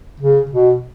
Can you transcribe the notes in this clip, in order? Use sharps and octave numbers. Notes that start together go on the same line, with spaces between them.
C#3
B2